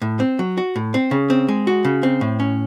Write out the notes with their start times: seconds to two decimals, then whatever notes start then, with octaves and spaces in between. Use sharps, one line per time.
0.02 A2
0.20 C4
0.39 F#3
0.58 F#4
0.76 A2
0.94 C4
1.11 C#3
1.30 C4
1.48 G#3
1.67 F#4
1.85 C#3
2.03 C4
2.21 A2
2.40 C#4